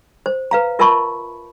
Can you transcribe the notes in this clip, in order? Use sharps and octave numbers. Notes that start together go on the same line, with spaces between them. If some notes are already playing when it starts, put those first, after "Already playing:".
C5
B4 F5 A#5
F4 A#4 E5 A5 B5 C#6